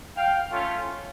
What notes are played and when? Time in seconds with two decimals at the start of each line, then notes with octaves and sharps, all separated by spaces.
0.16 F5 G5
0.51 A3 C#4 F4